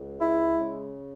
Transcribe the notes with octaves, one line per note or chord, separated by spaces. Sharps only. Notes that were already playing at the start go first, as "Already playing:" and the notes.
Already playing: C#2
G#3 E4
C#3